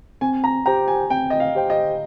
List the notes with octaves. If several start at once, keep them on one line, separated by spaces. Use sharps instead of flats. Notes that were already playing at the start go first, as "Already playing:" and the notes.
C4 G#5
A#5
G4 C5 G5 A#5
G#5
C4 G5
D#5
F5
G4 C5 G5
D#5